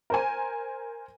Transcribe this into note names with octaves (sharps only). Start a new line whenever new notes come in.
A#4 C5 G#5